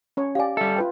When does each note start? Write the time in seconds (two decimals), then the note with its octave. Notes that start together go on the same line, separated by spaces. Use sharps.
0.17 C#4 C#5
0.35 G4 D5 F5 G#5
0.57 G3 A4 E5
0.76 F4 B4 G5